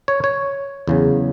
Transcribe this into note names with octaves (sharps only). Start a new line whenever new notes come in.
C#5
C#5
E2 C#3 F#3